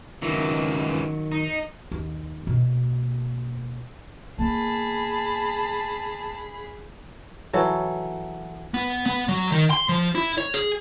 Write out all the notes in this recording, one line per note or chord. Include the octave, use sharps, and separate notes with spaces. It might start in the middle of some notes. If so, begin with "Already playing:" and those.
C#2 D#3 E3 F#3
D#4
D#2
B2 A#3
A#3 B3 G#4 A5 B5
E3 F#3 A4
B3
B3
F#3
D#3
C6
F3
E4
C#5
G#4